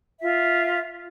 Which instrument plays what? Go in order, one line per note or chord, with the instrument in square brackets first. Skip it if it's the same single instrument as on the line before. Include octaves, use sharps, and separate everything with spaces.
[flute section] F4 E5